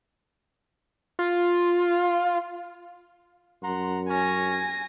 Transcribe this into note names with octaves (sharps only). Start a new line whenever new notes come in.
F4
F#2 F#5 A#5 C6
C#4 G#5 A#6